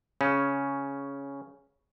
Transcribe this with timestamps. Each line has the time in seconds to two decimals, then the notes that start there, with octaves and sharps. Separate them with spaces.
0.21 C#3 C#4